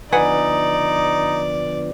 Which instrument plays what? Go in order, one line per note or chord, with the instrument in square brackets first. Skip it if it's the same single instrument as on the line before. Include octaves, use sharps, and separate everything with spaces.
[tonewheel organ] D3 F3 B3 [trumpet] D#4 [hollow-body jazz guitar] B4 F#5 G#5 [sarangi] D5